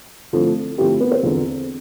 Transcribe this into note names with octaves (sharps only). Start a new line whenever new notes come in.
D3 F3 A3 C4 E4
D3 F3 A3 C4 E4 G4
B3 B4
C4 C5
E2 D3 F3